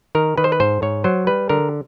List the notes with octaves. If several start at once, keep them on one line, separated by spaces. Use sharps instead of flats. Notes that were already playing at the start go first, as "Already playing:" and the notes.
D#3 A#4
D#3 B4
C5
B4
G#2 C5
G#2 C#5
F#3 C5
G3 B4
D3 A#4